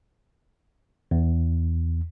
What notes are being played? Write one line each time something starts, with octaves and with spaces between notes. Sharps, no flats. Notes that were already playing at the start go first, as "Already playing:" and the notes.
E2